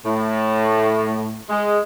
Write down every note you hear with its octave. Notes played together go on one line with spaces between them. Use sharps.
A2
G#3